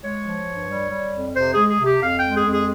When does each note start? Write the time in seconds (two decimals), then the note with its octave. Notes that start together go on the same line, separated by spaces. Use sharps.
0.02 G#3 C#5
0.24 F3
0.47 G2
0.69 G3
0.90 G3
1.12 F2
1.35 C3 C5
1.52 G#3 G#4
1.68 G#4
1.79 C3
1.84 G4
2.00 F2 F5
2.17 G5
2.23 G#3
2.33 G#4
2.45 F2
2.50 G#4